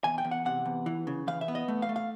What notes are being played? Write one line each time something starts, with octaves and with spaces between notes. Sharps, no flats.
E2 G#5
G5
E2
F#5
C3 F#5
E2
E3
C#3
E3 F5
E5
B3
D#5
A3
F5
A3
F5